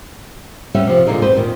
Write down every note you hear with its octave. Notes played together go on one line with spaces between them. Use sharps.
G3 B3 C#4 G4 E5
C3 F3
A#2 D3 A#3 D#4 G#4
E2 C4 B4 C5
D#2 A#2 D#3